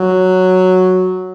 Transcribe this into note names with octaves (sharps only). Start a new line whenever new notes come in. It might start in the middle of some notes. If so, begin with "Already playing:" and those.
Already playing: F#3